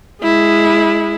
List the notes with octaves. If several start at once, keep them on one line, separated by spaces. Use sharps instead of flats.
G#3 E4